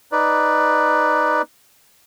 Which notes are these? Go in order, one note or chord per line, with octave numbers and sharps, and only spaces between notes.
D#4 B4 D5